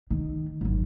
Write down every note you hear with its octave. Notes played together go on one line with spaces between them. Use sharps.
D#3
G#1 F#2